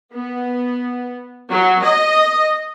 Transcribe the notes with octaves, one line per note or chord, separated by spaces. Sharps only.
B3
F#3
D#5